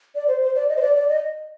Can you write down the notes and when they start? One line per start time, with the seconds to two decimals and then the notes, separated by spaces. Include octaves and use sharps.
0.15 D5
0.28 C5
0.42 C5
0.55 D5
0.69 D#5
0.76 C5
0.82 D5
0.95 D5
1.09 D#5